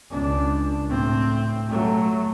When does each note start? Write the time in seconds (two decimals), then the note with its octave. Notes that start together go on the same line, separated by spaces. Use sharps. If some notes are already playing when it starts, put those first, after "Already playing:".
0.11 C#2 D4
0.87 A2 C4
1.67 F#3 A3